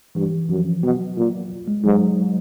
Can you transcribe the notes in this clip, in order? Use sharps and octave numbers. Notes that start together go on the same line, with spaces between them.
G2 E3
F#2 F3
B2 F#3
A#2
G#3
G#2 F#3